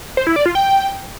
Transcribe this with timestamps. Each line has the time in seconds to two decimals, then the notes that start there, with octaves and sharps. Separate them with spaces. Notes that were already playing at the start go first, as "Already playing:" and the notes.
0.17 C5
0.27 E4
0.36 D5
0.46 F4
0.55 G5